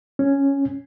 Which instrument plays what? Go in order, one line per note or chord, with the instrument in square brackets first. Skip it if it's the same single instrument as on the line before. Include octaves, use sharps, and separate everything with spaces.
[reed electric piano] C#4